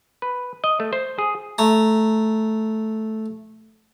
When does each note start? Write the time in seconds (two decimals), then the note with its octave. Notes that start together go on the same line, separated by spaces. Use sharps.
0.22 B4
0.64 D#5
0.80 A3
0.93 C5
1.19 G#4
1.58 A3 A#5